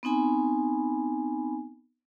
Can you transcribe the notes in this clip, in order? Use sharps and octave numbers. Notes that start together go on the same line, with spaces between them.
B3 C4 D#4 G#5 B5